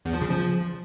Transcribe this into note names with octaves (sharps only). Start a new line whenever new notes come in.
E2
F3
C#3
F3